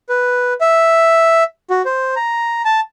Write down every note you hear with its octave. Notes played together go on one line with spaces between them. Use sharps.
B4
E5
F#4
C5
A#5
A5